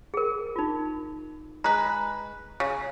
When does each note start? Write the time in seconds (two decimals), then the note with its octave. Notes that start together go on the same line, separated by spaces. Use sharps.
0.14 G#4 A#4
0.56 D#4 F4
1.64 G#3 B4 A#5
2.60 C#3